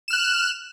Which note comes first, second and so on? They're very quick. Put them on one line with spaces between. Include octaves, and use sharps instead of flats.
E7 F6 F#6